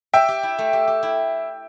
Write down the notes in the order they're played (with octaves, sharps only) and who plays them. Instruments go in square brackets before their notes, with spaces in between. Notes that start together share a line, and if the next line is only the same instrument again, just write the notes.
[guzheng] G4 [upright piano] E5 G5
[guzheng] G4
E4
A3
G4
G4
E4